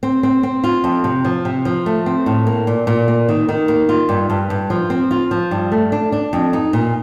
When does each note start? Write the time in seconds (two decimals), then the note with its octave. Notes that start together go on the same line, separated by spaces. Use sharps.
0.03 C4
0.23 C4
0.43 C4
0.64 F4
0.84 F2
1.04 C3
1.25 F3
1.45 C3
1.65 F3
1.86 A3
2.06 C4
2.26 A2
2.47 A#3
2.67 A#2
2.87 A#2
3.08 A#3
3.28 D#3
3.49 D#3
3.68 A#3
3.89 F4
4.09 G2
4.30 G2
4.50 G2
4.70 F3
4.90 C4
5.11 F4
5.31 F3
5.51 G2
5.72 A3
5.92 D4
6.12 D4
6.33 F2
6.53 D#4
6.73 A#2